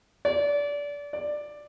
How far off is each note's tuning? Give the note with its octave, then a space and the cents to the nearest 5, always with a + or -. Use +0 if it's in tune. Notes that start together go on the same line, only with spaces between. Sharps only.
D5 -25
D5 +10